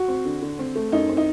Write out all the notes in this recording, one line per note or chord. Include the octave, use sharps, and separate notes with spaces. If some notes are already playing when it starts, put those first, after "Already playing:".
Already playing: F#4
C4
D3
D3
C4
A3
F#2 D#4
C4
D#4